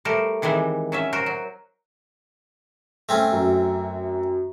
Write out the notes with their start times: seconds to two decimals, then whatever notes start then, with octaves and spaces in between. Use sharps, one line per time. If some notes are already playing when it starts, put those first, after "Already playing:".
0.05 G3 A3 A#4 C5
0.42 D#3 E3 G3 G#3 C4
0.92 F#3 C#4 E5
1.13 F#4 A#4 C5
1.26 F#3
3.09 A3 C4 C#4
3.32 F#2